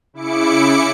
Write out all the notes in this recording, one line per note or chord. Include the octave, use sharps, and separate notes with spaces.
C#3 E4 D6 C#7